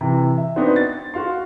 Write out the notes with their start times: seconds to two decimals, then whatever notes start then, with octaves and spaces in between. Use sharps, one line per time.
0.01 C3 E3
0.38 E5
0.56 B3 C4 D4 D#4 F#4 C5
0.76 A6
1.14 F#4 F5 C6